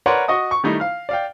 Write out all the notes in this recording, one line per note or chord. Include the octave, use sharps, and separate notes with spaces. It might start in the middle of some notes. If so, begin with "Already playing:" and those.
A#4 B4 C#5 D5 F#5 C6
F#4 D#5 C#6 D#6
C#6
D#3 G3 A3 D#4 E4
F5 F6
D5 F5 G5